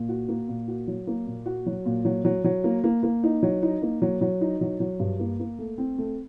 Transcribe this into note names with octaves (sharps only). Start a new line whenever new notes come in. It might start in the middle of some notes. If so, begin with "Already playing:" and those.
Already playing: A#2
F#4
A#3
A#2
F#4
F#3
A#3
A#2
F#4
F#3
A#2
F#3
F#3
F#3
A#3
A#3
A#3
D#4
F#3
D#4
A#3
F#3
F#3
D#4
F#3
F#3
G2
A#3
A#3
A3
C4
A3